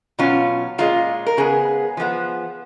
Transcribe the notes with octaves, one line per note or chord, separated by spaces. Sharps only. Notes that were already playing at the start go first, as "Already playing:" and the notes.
B2 F#3 C#4 F4
A#2 G#3 C#4 F4
A#4
C#3 G#3 B3 G#4
F3 G#3 B3